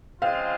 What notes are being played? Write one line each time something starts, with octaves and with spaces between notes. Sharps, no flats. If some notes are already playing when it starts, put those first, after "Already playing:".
C#3 F3 G#3 C4 F4 F5